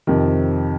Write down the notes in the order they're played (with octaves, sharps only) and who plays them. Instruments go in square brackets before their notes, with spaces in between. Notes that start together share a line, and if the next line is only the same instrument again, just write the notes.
[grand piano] F2 C3 D#3